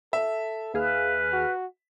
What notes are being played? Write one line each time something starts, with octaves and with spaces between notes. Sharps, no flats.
A4 E5
D#2 G#4 B4 F5 F6
F#4